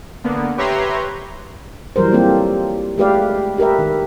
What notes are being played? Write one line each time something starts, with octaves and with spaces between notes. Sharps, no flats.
D3 A#3 B3
G4 B4 C#5 E5 A#5 C6
E3 F#3 G3 A#4 C5
E3 A#3 C4 F4 G4 A4
G#3 A3 G4 B4 D5 F5
G4 A#4 B4 E5
D#3